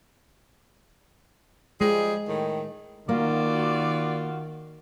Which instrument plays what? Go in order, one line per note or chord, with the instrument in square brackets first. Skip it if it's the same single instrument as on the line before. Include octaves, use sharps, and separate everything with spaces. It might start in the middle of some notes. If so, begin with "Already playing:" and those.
[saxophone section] F3 G3 G#4 [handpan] G#3
[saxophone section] A2 D#3
[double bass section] D#3 [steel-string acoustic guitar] A#3 [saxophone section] F4 F#4 [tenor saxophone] D5